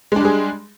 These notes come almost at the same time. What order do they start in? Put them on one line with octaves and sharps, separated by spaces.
G#3 D4 G3 G#4